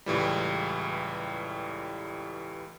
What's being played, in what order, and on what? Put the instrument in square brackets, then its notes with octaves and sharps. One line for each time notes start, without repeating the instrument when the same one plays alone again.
[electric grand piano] C#2 A2 E3 G3